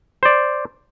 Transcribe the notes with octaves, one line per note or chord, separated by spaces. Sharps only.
C5 D5